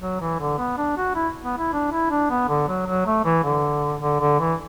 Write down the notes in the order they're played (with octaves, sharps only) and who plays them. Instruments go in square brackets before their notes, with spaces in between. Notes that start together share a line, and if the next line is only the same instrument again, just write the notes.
[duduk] F#3
E3
D3
B3
D4
F#4
E4
B3
E4
D4
E4
D4
B3
D3
F#3
F#3
A3
E3
D3
D3
D3
E3